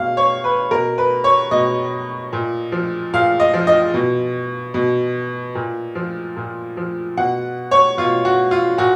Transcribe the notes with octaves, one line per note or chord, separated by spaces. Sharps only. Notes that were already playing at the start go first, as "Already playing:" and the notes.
Already playing: B2 F5
C#5
B4
B2 A#4
B4
C#5
B2 D#5
A#2
F3
A#2 F5
D#5
F3
D#5
B2
B2
A#2
F3
A#2
F3
B2 F#5
C#5
B2 F4
F#4
F4
A#2 F#4